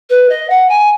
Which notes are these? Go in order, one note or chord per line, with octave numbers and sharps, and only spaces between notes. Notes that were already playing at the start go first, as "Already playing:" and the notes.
B4
D#5
F#5
G#5